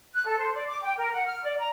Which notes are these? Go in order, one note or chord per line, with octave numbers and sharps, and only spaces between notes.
F#6
A4
C5
D5
D6
G5
A#4
F#5
F6
D5
A#5